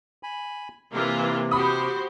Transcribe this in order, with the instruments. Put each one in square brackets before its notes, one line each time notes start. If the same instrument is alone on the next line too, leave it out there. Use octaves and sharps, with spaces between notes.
[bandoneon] G#5 B5
[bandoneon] C3 [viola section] E3 A#3 F4
[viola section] F#4 G4 C5 [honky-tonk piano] B5 D#6